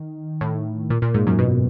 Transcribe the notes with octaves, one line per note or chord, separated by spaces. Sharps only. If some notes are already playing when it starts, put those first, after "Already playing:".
Already playing: D#3
A2
A#2
A#2
G#2
F#2
B2